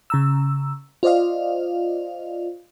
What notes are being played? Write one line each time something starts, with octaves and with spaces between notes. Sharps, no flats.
C#3 A#5 E6
F4 C5 D5 D#5 F5